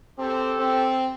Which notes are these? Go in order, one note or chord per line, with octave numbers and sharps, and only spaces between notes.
C4 G4 A4
C4